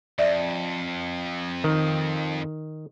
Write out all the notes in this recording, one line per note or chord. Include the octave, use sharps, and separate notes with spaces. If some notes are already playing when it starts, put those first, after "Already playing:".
F2 D5 E5
D#3